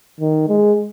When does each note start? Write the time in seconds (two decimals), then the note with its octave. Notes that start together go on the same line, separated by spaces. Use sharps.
0.20 D#3
0.48 G#3